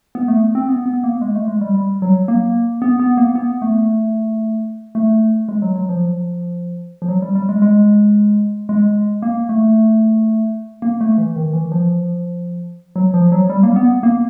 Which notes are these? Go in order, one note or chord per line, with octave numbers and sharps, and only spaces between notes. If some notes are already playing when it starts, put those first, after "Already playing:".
B3
A3
C4
B3
B3
A#3
G#3
A3
G#3
G3
G3
F#3
A#3
B3
B3
A#3
B3
A3
A3
G#3
F#3
F#3
F3
F3
F#3
G3
G3
G#3
G#3
G#3
A#3
A3
A#3
A3
E3
D#3
E3
F3
F#3
F3
F#3
G3
A#3
B3
A#3